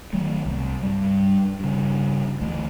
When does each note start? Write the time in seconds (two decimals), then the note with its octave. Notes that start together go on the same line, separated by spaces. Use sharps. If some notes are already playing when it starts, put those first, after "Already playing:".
0.13 D#3 F#3 A3
0.45 C2
0.82 G2 G3
1.60 G2 C#3
2.41 D2 E3 A3